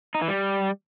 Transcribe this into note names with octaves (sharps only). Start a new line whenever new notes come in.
D#4
E3
G3